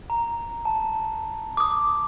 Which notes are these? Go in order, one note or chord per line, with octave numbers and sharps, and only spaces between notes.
A#5
A5
D6 D#6